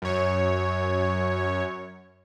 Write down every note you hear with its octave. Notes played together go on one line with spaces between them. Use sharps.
F#2 C#5